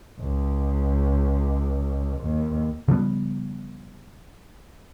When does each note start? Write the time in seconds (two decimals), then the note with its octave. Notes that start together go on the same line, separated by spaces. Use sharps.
0.20 C#2
2.21 D#2
2.88 C#3 F3 G3 B3